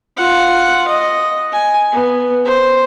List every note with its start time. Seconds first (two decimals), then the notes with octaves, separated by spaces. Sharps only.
0.17 F4 F#5
0.88 D#5
1.53 G#5
1.92 B3
2.45 C5